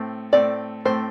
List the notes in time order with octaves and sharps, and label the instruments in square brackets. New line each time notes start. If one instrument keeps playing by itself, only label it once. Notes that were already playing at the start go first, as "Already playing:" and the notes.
Already playing: [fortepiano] A2 A3 C4
[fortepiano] A2 A3 C4 [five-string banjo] D5
[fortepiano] A2 A3 C4 [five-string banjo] C5